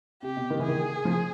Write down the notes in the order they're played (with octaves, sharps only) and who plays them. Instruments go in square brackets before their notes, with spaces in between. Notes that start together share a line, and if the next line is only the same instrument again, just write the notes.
[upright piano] C3 [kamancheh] G4
[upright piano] B2
D#3
E3
[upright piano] D#3 [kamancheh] G#4
[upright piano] F3